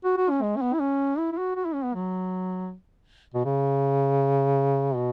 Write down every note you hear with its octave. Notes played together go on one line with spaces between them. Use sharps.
F#4
F#4
C#4
G#3
C#4
B3
E4
C#4
E4
E4
F#4
F#4
E4
C#4
B3
F#3
B2
C#3
B2